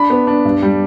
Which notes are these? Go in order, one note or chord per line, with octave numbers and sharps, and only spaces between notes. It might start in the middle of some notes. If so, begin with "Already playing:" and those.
Already playing: D4 B5
B3
D4
G2
G3